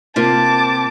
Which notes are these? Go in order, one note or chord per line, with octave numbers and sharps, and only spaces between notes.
C3 A#3 F4 A5 D6